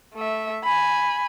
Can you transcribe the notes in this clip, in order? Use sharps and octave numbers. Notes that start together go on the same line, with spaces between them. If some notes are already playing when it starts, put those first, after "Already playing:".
A3 E5
G#5 B5